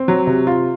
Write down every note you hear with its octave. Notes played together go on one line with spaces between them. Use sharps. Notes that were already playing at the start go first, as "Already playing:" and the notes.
Already playing: C4
F#3
C3
F4